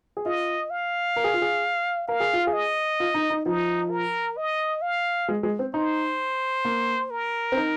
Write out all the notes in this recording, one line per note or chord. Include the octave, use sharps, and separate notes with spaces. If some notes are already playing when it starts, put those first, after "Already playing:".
G#4
F4 D#5
F5
A#4
G#4
F4
G#4
A#4 F5
G#4
F4
G#4
D#5
F4
D#4
D#4
F3 D#4
A#4
D#5
F5
G#3
G#3
C4
D#4 C5
A#3
A#4
C4
D#4